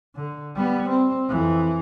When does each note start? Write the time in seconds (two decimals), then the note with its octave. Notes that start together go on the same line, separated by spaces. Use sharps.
0.15 D3
0.55 G3 B3
0.89 C4
1.28 F2 E3